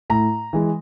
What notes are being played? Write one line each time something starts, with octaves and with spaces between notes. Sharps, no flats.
A2 A#5
E3 G#3